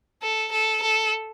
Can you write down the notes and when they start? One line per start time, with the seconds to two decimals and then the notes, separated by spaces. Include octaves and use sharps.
0.22 A4
0.52 A4
0.82 A4